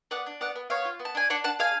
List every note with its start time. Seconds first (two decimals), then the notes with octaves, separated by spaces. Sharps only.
0.11 B3 D5 F#5
0.26 D4
0.41 B3 D5 F#5
0.56 B3
0.70 B3 C#5 F5
0.85 F4
1.00 B3
1.05 A5
1.15 D4 G#5
1.30 D4 D5 F#5
1.44 D4 F#5 A5
1.59 G#4 F5 G#5